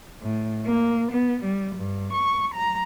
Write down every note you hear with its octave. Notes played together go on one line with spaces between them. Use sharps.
A2
A#3
B3
G3
G2
C#6
A#5